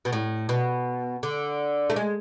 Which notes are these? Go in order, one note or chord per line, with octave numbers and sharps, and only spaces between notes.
B2
A2
B2
D3
A3
G#3